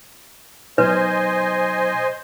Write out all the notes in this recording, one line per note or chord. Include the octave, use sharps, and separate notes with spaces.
B2 F#3 D#4 B4 C5 D#5 G#5